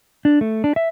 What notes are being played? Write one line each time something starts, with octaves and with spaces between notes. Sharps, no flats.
D4
A3
D4
E5